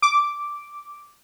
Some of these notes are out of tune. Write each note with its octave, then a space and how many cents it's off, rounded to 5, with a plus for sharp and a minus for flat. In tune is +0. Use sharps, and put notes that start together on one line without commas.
D6 -5